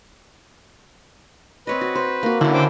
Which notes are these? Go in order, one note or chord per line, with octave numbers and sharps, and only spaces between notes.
C4 B4 C#5 D#5
F#4
C5
A#3 F#4
D3 C#4 E4
C5 G5 D6